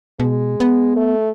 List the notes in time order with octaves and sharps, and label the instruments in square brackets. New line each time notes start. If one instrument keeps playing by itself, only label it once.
[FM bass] B2 [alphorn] G#3
[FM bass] B3
[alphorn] A3